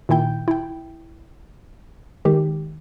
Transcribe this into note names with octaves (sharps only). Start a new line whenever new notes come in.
A#2 D#3 E4 G5 G6
E4 G5
D#3 G#3 G4